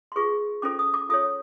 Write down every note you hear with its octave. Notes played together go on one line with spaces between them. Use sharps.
C6
F4 G#4 B4 C#6
C#4 F4 A4 C5 D6
D#6
D6
F4 A4 C#5 D#6